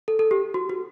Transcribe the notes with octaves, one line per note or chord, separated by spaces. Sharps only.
A4
A4
G4
F#4
F#4